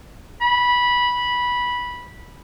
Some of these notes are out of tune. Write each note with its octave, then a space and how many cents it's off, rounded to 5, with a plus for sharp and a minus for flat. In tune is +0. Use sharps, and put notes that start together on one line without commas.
B5 -15